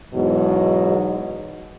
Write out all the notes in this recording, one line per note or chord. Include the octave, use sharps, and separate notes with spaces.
E2 G#2 B2 F#3